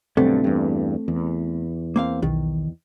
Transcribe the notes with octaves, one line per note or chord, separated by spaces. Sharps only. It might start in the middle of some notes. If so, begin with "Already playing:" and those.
B1 G2 D3 A3 C4
E2 G2
E2
A#3 C4 F5
B1 D#3